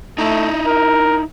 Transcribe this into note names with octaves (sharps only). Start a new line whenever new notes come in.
A3 D#4 E4
A#4